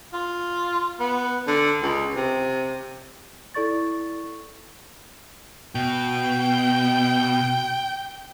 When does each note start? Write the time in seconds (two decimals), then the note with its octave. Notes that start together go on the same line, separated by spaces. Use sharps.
0.13 F4
1.00 B3
1.47 D3
1.82 C#2
2.15 C3
3.54 E4 A4 D5 C#6 A6
5.75 B2 G5